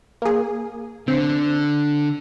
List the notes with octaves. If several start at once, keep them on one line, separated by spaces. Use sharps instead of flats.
A#3 G#4
D3 C4